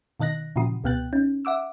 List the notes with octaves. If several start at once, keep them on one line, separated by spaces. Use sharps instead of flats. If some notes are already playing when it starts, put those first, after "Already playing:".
B2 D#3 D#5 F#6 A#6
A#2 C#3 E3 F3 F#4 D#6
C#2 B2 B3 G5 F#6 A6
C#4 D#4
E5 F#5 D6 E6